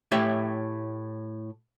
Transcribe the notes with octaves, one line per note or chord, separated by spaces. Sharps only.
A2 E4 G4 C#5 E5